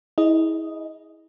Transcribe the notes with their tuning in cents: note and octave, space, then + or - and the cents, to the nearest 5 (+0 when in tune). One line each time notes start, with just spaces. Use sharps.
E4 -35 G#4 +0 D#5 +0